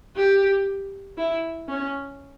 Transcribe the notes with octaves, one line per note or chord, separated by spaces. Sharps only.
G4
E4
C#4